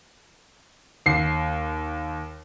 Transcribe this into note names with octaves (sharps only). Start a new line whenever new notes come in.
D#2 C7